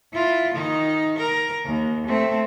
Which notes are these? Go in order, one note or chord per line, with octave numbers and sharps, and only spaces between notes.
E4 F4
D#3 D#4
A#4
D#2
A3 C4